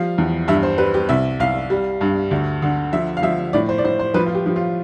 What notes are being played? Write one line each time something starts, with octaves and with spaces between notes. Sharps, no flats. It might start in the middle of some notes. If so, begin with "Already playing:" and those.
Already playing: F3 G3 F5
E2
G2 E5
C5
G3 B4
G4
C2 E5
C2 F5
G3
G2
D2
D3
F3 E5
F5
F3 E5
A2 D5
C5
D5
A2 C5
C5
F3 B4
F4
G4
F3
F4